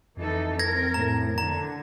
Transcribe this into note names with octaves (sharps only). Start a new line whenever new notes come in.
F2 E3 D#4 A4
C4 A#4 G#6 A#6
A2 A#5
D3 A#5